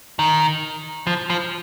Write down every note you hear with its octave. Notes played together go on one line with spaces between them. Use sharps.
D#3
F3
F3